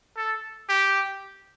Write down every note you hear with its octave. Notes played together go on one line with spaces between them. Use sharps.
A4
G4